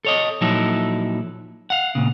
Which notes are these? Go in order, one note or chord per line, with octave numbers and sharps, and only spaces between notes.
A4 C#5 D#5
A#2 F3 F#3 D#4 E4 A4
F5 F#5
A#2 C#3